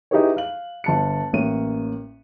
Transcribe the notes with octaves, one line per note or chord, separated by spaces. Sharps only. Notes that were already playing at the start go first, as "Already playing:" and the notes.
D#4 E4 G4 G#4 B4 C#5
F5 F#7
G1 A5 C#7
A1 A#3 C#5 D#7